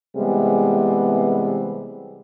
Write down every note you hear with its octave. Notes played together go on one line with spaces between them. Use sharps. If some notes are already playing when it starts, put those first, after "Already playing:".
C3 E3 G3 G#3 B3 G#4